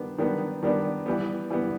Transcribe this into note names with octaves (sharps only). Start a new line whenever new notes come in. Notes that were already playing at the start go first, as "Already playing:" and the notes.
Already playing: D#3 G3 B3 D4
D#3 G3 B3 D4
D#3 G3 B3 D4
E3 G3 B3
E3 G3 B3